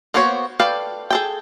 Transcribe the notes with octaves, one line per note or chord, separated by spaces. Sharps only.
A#3 B3 F#4 C5 C#5
A4 B4 D5 F5 G5
G#4 A4 G5